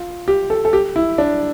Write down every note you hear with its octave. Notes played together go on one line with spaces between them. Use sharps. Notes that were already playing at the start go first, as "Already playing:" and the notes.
Already playing: F4
G4
A4
A4
G4
E4
D4